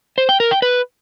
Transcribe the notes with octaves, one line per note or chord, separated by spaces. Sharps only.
C5
G5
A#4
G5
B4